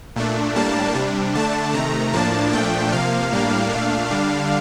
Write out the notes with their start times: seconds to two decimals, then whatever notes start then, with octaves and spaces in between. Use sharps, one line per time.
0.16 A#2 A3 D4
0.55 A2 G3 A#3 D4 A5
0.95 C3 G3 D4
1.35 D3 A3 D4 A5
1.73 C3 D#3 A3 A#5
2.13 A2 F3 A#3 D4 A5
2.53 A#2 F3 A3 D4 G5
2.92 C3 F3 A#3 F5
3.32 A2 G3 A#3 D4
3.71 A#2 A3 D4
4.10 D3 G3 D4